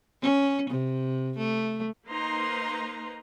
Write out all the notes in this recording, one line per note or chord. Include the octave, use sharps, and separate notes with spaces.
C#4
C3
A3
A#3 D#4 B4 C5 A#5 C6